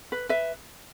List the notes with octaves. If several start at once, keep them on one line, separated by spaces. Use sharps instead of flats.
B4
B4 E5